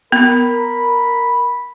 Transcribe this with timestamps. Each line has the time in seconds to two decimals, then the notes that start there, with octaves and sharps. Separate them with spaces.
0.12 B3 A#4 B5